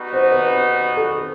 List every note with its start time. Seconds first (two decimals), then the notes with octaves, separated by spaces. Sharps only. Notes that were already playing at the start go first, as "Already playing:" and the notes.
Already playing: G3 B3 D#4 F#4
0.13 C5
0.32 B4
0.97 A4